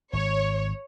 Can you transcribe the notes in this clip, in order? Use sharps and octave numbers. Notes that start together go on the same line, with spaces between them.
G#1 C#5